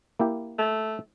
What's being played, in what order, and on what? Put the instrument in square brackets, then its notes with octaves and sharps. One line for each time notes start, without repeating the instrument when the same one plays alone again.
[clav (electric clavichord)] A#3 E4 G4
[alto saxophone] A3